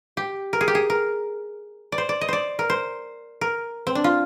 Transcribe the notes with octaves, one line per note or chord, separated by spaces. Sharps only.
G4
A#4
G#4
G4
G#4
A#4
D5
C5
D5
D#5
C5 D5
A#4
C5
A#4
C4
D4
F4